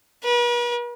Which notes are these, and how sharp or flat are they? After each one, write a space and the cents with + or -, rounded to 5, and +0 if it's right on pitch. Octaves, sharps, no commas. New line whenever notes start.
B4 -45